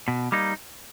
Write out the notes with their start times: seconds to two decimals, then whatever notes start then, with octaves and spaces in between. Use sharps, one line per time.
0.08 B2
0.32 G3 A#3 D#4